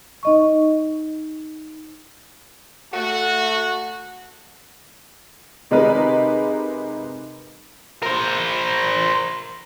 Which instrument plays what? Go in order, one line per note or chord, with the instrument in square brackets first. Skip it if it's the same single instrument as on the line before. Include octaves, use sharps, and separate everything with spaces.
[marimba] D#4 D#5 C#6
[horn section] A3 F#4
[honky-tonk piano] C3 G#3 D#4 A#4 B4
[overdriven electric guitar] A#4 C5